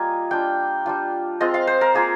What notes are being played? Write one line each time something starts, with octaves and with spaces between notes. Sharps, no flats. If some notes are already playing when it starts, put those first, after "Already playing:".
Already playing: G3 A#3 F4 D#5 G#5
G3 D4 F4 G5
G3 D4 F4
G#3 C4 F4 D#5
F5
C5
A#4
A#3 F4 G#4